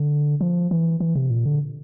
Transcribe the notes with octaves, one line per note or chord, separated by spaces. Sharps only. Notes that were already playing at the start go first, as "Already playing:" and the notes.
Already playing: D3
F3
E3
E3
C3
A#2
D3